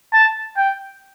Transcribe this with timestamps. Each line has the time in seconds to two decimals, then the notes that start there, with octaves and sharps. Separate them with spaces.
0.13 A5
0.57 G5